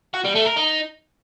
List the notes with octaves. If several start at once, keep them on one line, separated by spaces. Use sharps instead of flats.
F#4
G3
A3
A#4
D#4